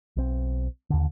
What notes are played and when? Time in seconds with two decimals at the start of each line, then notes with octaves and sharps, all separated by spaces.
0.16 B1 C4
0.90 D#2 D3